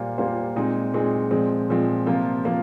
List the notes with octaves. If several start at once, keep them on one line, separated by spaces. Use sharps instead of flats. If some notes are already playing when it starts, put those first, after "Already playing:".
Already playing: A#2 G3 A#3 F4 C5
A#2 G3 A#3 F4 C5
A#2 G#3 C4 D#4 G#4
A#2 G#3 C4 D#4 G#4
A#2 F3 G#3 C4
A#2 F3 G#3 C4
C3 F3 A#3 F4
F3 A#3 F4